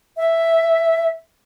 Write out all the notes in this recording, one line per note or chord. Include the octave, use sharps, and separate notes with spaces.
E5